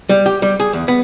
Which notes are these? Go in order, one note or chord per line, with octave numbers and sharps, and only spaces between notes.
G3
G4
G3
G#4
E2
B3